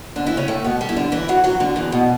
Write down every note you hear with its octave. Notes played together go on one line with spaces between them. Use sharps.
D3 D4
E3 E4
C#3 C#4
A2 A3
B2 B3
G3 G4
E4
D3 D4
E3 E4
F#3 F#4
F#3 F#4
D3 D4
E2 E3
B2